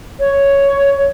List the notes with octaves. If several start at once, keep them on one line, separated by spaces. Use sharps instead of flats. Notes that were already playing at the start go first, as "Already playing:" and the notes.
C#5